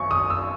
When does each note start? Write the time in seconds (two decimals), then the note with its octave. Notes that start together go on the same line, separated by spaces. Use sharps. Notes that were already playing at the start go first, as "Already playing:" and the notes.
Already playing: G#1 F#2 C#6
0.11 D#6
0.30 E6